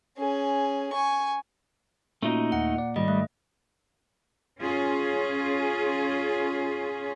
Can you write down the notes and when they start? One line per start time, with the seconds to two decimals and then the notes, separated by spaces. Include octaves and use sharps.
0.18 C#4 G#4
0.93 G#5 C#6
2.22 A#2 A3 C#4 D#4 F4 F#4
2.52 D#2 F#5
2.78 D5
2.96 G#2 D#3 G3 D#5
3.08 A3
4.61 C#4 F4 G#4